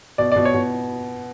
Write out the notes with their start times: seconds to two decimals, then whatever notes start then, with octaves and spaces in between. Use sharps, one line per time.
0.18 B2 D5
0.32 B2 D5
0.45 C#5
0.54 B2